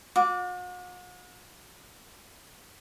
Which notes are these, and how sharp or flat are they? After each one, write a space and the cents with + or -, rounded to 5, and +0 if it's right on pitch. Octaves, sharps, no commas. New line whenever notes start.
F#4 -45 D6 -10